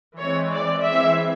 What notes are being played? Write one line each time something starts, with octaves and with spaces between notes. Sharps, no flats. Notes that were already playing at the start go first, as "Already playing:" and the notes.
E3 G#3 C4 C#5
D5
E3 G#3 C4 E5